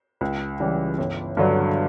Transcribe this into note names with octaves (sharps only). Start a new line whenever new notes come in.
C#2
C#3 E3 G3
G1
G2 D3 F#3